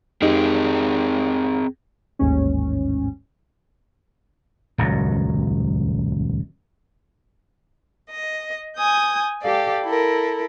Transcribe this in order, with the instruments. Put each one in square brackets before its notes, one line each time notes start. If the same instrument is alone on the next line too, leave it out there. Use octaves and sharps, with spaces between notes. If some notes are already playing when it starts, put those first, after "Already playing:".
[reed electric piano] F2 D#4 G4 [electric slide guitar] C4 G#4 A#4
[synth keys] A1 D#2 G#2 C#4
[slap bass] D#1 C#2 F#2 F#3
[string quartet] D#5
G#5 D#6 G6
G4 A4 D5 F5
E4 A4 A#4